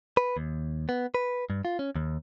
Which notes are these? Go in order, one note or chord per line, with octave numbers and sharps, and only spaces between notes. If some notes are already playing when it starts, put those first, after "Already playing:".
B4
D#2
B3
B4
G2
F4
C#4
D#2